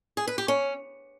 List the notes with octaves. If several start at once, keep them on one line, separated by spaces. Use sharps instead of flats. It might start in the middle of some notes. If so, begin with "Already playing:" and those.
G#4
B4
G4
C#4